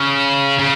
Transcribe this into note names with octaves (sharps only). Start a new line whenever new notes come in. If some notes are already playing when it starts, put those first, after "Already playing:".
Already playing: C#3
C#3